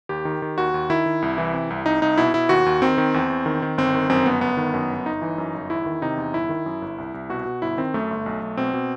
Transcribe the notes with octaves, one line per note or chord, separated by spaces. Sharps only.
D#2 G4
D#3
D#3
D#2 F#4
D#2
D#3 E4
D#3
C2
E3
C3
C2
C2 D#4
C2 D#4
B2 E4
B2 E4
D#2 F#4
D#2
D#3 C4
D#3
E2
E2
D#3
D#3
G1 C4
D#3
F#2 C4
G1 B3
G1 B3
D#3
F#2
G1
G1 D#4
E3
F#2
G1
E2 E4
D#3
C3 D#4
E2
G1 E4
D#3
F#2
G1
C2
C2
B2 F#4
B2
G1 E4
D#3 C4
F#2 A3
G1
B1
B1
B2 C4
B2